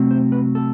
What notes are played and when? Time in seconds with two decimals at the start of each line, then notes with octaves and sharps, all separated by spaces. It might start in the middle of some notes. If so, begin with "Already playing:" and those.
Already playing: C3 F#3 A3 C4
0.11 C5
0.32 B4
0.55 A4